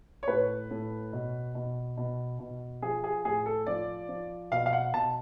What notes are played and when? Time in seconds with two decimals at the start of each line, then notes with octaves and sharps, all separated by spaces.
0.23 C#5
0.28 A2 B4
0.71 A2
1.13 B2
1.55 B2
1.97 B2
2.39 B2
2.82 F3 G#4
3.04 G#4
3.25 A2 G#4
3.46 A4
3.67 F3 D5
4.09 F3
4.52 B2 F5
4.66 F5
4.73 F#5
4.93 B2 A5